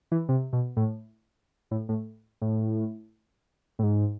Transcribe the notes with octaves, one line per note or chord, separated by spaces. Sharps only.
E3
C3
B2
A2
A2
A2
A2
A2
G#2